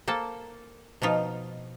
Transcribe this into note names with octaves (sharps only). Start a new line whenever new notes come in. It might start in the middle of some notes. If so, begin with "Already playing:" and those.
A#3 A4 C5 A5
B2 F3 D#4 F4